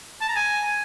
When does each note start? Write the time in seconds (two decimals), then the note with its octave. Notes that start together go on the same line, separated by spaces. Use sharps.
0.21 A5
0.29 A#5
0.36 G#5